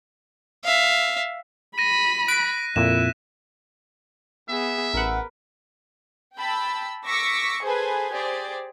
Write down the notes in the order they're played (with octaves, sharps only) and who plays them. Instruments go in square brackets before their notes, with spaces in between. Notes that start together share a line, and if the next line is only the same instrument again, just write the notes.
[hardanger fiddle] E5 F5
[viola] B5 [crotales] A#6 D#7
[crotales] F#6 B6 [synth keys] D7
[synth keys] F2 A#2 [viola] E4 [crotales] E7
[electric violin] B3 G#4 [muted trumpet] E5
[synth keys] A1 F#5 [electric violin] A#4 B4
[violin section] G5 A5 B5 E6
C#6 D6 E6 A#6 B6 C#7
G#4 A4 B4 C5 G#5
G4 G#4 C5 D5